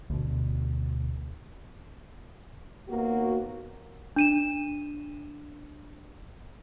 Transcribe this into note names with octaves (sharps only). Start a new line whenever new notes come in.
D2 B2
D#2 A#3 B3 F#4
D4 D#7 E7